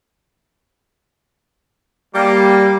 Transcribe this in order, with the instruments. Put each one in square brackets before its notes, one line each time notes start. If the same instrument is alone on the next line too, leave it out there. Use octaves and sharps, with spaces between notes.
[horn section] G3 [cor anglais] A#3